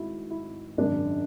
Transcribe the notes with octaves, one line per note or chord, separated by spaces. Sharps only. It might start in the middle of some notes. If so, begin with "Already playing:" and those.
Already playing: G#1 G#2 E4 F#4
E4
G#1 F#2 C#3 D4